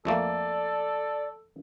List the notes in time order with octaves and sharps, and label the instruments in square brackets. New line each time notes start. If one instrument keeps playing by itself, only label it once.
[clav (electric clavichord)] F2 A3 A#3 [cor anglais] A4 [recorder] D5